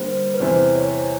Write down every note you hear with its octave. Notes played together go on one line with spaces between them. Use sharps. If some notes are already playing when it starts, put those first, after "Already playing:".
Already playing: D3 G3 A#3 C5
B4
E2 C3 E3 C5
C#5